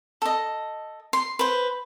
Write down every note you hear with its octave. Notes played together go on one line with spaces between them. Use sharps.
A4 D#5
C6
B4 C5